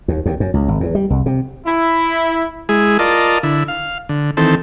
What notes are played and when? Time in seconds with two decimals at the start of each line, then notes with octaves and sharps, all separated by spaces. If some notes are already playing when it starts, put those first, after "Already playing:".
0.08 D#2
0.26 D#2
0.40 F#2
0.54 C#2
0.68 G#1
0.80 E2
0.95 G3
1.10 C2
1.26 C3
1.65 E4
2.69 G#3 E4 G#4
2.99 F4 A#4 D5 D#5 A5
3.43 D3 E4
3.68 F5
4.09 D3
4.37 D#3 E3 C4 A4